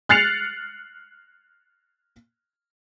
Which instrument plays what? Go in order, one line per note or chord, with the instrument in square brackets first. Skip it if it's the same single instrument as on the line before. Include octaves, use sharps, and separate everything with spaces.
[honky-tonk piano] F6 F#6 A6 C7 C#7 F7